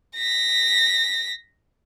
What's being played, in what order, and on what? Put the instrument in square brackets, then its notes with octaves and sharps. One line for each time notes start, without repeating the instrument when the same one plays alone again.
[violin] A#6 B6